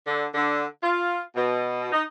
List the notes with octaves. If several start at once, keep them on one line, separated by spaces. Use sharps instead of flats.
D3
D3
F4
B2
D#4